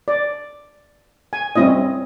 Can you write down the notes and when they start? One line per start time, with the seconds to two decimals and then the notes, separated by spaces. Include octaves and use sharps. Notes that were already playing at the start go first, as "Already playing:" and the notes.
0.08 D5
1.33 G#5
1.56 G3 C4 C#4 E4 D#5